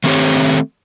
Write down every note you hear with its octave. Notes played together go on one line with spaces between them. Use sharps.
D#3 A3 C4 G4 C#5